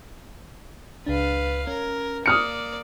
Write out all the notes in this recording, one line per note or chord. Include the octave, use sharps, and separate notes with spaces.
C#2 D4 B4 F5
C#4 A#4
A#3 D5 D#6 F6 C#7